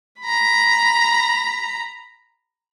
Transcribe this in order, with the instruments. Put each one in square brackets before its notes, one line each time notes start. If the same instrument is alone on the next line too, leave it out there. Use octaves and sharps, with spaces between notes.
[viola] A#5 B5